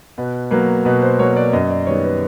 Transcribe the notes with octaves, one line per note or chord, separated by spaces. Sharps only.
B2 B4
F#3 A#3 B4
B2 B4
C5
F#3 A#3 C#5
D5
F#2 D#5
D5
D#3 G3 B3 C#5
B4